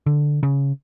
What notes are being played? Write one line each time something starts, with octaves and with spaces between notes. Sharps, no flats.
D3
C#3